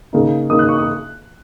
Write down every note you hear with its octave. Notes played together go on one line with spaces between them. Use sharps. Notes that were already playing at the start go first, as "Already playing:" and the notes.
C#3 A#3 D#4
C#3 A#3 D#4 D#6
F#6
C#6
D#6